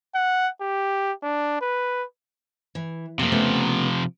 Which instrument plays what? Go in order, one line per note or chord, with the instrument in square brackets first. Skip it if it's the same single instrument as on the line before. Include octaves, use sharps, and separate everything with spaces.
[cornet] F#5
G4
D4
B4
[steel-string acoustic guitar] E3
[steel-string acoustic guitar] F2 A#3 [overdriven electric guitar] C3 F3
[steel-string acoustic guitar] C#3 A3 B3